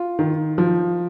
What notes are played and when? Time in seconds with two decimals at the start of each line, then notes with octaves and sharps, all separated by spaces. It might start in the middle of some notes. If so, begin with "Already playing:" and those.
Already playing: F4
0.19 D#3
0.58 F3